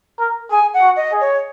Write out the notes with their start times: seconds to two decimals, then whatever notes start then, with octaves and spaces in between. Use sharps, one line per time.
0.20 A#4
0.51 G#4 G#5
0.74 F#5
0.82 F#4
0.96 D#5
1.12 G#4
1.21 C#5